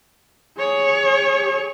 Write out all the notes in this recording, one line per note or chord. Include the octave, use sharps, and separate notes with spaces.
G#4 C#5